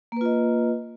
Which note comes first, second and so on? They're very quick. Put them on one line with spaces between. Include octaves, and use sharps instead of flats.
A#3 B4 F4 D#5